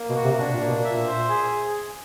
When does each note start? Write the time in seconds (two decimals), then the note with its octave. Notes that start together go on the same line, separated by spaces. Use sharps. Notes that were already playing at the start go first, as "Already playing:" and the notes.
Already playing: A#3
0.09 B2
0.16 F#4
0.24 C3
0.38 B2 D4
0.53 A#2
0.61 A#3
0.68 B2
0.84 A#2 E5
1.06 C5
1.28 G#4